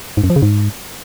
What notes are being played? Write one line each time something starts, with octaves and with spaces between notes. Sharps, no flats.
G#2
F#2
F3
C#3
G#2